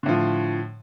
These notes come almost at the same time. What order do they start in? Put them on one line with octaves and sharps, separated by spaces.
D3 A2 F3